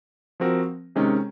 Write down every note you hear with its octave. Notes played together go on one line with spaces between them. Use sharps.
F3 C4 F#4 A#4
C3 D#3 G#3 C#4